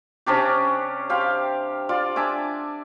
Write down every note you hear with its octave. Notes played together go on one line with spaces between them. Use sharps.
C3 C#4 D4 G4
G4 F5 C6
F4 D5
D4 E5 G#5 D6